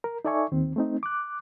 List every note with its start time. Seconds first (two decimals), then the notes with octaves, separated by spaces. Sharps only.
0.04 A#4
0.25 D#4 A4 D5 E5 G#5 C#6
0.52 D#2 D#3 C4
0.76 A3 C4 D#4
1.03 D6 F#6